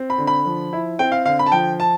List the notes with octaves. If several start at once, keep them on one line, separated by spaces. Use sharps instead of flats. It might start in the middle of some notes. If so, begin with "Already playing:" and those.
Already playing: C4
B5
D3
B5
F3
E4
C4 G5
F5
D3 F5
B5
A5
F3 G5
A5